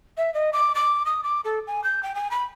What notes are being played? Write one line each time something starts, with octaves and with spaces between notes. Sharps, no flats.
E5
D#5
D6
D6
D#6
D6
A4
G#5
G6
G5
G#5
B5